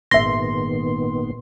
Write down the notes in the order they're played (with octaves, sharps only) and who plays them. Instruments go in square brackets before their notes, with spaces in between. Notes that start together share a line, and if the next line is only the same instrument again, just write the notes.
[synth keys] G#1 C6 [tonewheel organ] A#2 D#3 B3 [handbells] E5 A#6